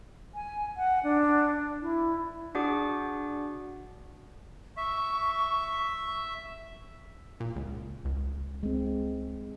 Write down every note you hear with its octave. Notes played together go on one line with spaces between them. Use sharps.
G#5
F#5
D4
E4
D4 F#4 G#4 D5 F#5 D6
E5 C#6
A#2
C#2
C#2
G#3 C4